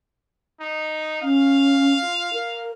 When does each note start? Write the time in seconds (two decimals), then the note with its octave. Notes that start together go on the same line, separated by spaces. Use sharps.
0.60 D#4
1.22 C#4 F5
2.01 F4
2.33 A#4